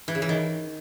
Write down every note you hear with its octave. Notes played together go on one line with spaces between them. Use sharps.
E3
C#3
E3
D#3